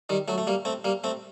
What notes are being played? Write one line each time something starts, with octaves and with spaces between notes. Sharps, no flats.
D#3 G3
F#3 A3
A3
G3 A#3
A3 C4
G3 A#3
A3 C4